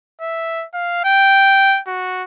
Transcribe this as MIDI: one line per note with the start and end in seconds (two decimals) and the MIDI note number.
0.22 0.66 76
0.74 1.03 77
1.05 1.80 79
1.87 2.24 66